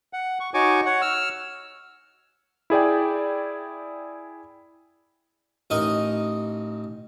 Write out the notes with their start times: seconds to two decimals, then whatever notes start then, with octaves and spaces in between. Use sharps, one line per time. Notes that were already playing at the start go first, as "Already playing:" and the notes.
0.13 F#5
0.40 C#6
0.54 D#4 F#4 C#5 G#5 C#6 D6
0.86 C#5 F#5
1.02 E6 F6
2.70 E4 G#4 D5 G5
5.70 A1 D#4 A#4 D#6